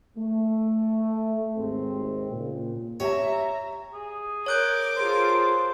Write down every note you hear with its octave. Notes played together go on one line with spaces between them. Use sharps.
A3
G#1 D#2 G#3 C4
A#2 C#3
G4 C#5 E5 A#5
G#4
A#4 C#5 D6 F#6 G6
F4 G#4 A4 C5